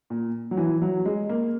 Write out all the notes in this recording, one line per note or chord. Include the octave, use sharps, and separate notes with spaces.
A#2
F#3
E3
F#3
G#3
A#3